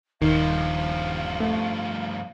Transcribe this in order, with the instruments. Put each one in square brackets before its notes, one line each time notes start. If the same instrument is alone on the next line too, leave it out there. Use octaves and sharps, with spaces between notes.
[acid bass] D#1 [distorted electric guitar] G2 F3 [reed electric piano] D#3 [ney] F5
[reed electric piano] A3